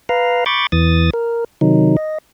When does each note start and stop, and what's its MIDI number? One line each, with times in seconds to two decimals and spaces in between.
0.09 0.44 71
0.09 0.44 77
0.09 0.44 82
0.46 0.67 83
0.46 0.67 85
0.46 0.67 86
0.46 0.67 91
0.46 0.67 93
0.72 1.10 40
0.72 1.10 52
0.72 1.10 87
0.72 1.10 93
1.14 1.44 70
1.61 1.96 48
1.61 1.96 51
1.61 1.96 54
1.61 1.96 63
1.97 2.18 75